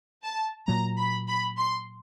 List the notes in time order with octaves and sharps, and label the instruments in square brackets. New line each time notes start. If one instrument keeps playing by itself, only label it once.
[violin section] A5
[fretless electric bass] A#2 F#3 A#3 [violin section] A#5
[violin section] B5
B5
C6